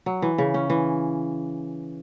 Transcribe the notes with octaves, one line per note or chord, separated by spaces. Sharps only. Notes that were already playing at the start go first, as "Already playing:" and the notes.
F#3
E3
C#3
C#4
E3